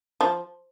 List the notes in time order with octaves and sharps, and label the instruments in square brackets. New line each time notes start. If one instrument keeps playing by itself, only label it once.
[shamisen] F3